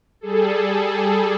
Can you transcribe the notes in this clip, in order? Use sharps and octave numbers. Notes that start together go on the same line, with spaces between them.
G3 G#4 A4